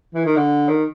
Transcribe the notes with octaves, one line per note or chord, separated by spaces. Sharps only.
E3
D#3
D3
D#3